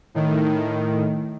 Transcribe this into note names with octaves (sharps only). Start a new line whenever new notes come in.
A2 D#3